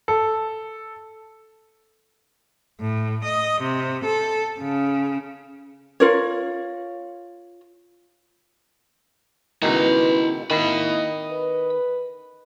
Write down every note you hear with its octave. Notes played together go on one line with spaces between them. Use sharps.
A4
A2
D#5
C3
A4
C#3
F4 A#4 C#5
C#2 B2 D#3 E4 B4 A#5
D#3 A#3 E4 D#5 B5
B4